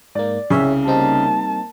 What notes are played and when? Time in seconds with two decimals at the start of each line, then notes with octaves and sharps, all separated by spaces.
0.15 G#2 A#3 D5
0.50 C2 C#3 G#4 C#5 E5
0.86 G3 A#3 C4 D#4 A5